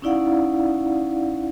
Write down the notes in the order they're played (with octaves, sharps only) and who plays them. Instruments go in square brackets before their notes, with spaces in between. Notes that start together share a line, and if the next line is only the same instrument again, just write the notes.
[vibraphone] C#4 D#4 E4 D5 F5 F#5